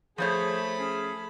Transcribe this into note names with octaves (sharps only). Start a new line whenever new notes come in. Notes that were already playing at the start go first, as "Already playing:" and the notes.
F3 A3 G#4 C5 C#5 B5
C#4 G#4